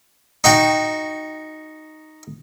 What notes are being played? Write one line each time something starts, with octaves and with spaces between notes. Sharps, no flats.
D#4 F#4 G5